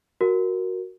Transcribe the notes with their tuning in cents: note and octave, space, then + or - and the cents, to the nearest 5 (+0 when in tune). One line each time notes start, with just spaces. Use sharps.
F#4 +0 A#4 +0